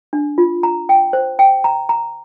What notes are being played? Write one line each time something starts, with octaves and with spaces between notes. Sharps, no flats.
D4
F4
A#5
G5
C5
G5
A#5
A#5